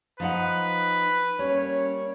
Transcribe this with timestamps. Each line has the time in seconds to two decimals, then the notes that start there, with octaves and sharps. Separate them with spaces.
0.20 F3 D#4 B4 F#5
1.39 G3 A#3 C#4 C#5